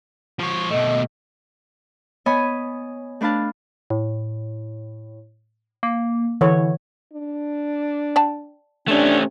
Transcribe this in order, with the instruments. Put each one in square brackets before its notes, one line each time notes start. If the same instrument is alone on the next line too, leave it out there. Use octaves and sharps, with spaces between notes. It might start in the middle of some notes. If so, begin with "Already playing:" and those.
[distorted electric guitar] F3 C#5
[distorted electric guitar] B2 A3 [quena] D#5
[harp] B3 C#5 D#5 G#5 B5 D#6
A3 D4 B4 F5 A5
[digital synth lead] A2
A#3
[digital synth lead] D3 [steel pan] E3 C#5
[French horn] D4
[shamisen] D5 G5 A5
[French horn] C3 [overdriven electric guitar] A3 C#4 [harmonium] D4